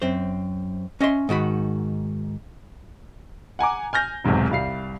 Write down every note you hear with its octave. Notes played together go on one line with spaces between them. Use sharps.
F#2 C4 C5
C#4 D#5 E5 C6
G#2 D#3 F#4 B5
F#5 G#5 A#5 D6
G#5 F6 G6 A#6
B1 E2 G#2 C3
C2 G3 F5 C7